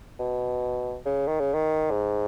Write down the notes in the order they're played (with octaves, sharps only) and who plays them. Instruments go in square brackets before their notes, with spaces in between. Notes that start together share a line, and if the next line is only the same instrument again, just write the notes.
[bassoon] B2
C#3
D#3
C#3
D#3
G#2